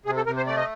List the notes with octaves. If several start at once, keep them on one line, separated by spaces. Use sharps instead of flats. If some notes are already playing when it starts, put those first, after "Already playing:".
C3 G#4
A4
C3 A#4
C5
A3 D5
D#5